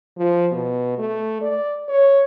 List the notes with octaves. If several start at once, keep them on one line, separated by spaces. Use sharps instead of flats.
F3
B2
A3
D5
C#5